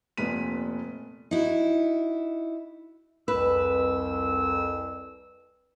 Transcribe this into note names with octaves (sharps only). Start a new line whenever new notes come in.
F1 A#2 B3 B6 D#7
D#4 E4 F#4
C2 F2 B4 E6